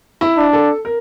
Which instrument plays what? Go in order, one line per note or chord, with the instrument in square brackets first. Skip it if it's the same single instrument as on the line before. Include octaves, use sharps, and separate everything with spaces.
[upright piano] E4
[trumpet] D4
[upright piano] A4
A#4